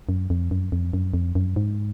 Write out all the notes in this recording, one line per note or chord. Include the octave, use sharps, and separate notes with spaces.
F#2
F2
F#2
F2
F#2
F2
F#2
G#2